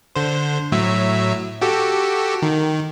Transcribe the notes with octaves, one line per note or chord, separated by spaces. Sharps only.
D3 C5
A2 F#3 E5
F#4 G4 A4
D#3